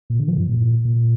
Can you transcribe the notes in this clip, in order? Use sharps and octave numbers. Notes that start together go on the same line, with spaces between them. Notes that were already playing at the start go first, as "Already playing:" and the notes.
A#2
D3
F3
G2
A#2
A#2